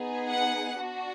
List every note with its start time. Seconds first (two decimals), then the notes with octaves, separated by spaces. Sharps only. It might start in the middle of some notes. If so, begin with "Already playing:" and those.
Already playing: B3 D#4 G#4
0.29 F#5
0.76 D4 F#4